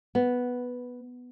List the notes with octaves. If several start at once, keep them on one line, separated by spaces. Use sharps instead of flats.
B3